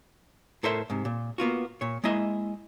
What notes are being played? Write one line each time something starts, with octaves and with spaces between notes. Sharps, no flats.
A2 A4 A#4 C5 E5 C6
G#2 C3
A#2
A#3 B3 F4 F#4
A#2 C#5
G#3 A#3 E4 D#5 E5